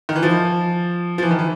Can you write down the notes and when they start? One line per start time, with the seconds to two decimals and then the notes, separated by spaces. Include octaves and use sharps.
0.09 D#3
0.16 E3
0.23 F3
1.18 F3
1.23 E3
1.31 D#3
1.39 E3